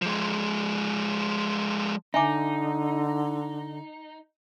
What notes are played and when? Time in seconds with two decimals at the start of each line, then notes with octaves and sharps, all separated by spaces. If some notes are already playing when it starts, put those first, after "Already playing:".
0.02 F3 G#3
2.14 D3 D#4 E5 G#5 D6